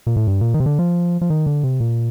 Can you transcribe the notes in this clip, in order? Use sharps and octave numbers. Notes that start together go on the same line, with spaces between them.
A#2
A2
G2
A#2
D#3
C3
D3
F3
F3
D#3
D3
C3
A#2